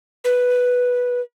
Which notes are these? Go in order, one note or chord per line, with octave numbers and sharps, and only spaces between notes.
B4